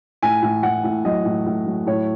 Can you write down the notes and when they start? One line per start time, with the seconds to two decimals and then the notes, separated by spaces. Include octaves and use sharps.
0.22 A2 G#5
0.43 A2
0.63 A2 F#5
0.84 A2
1.05 F#3 D#5
1.25 A2
1.46 A2
1.66 F#3
1.87 A2 C#5